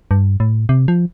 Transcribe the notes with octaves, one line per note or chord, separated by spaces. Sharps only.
G2
A2
C3
F3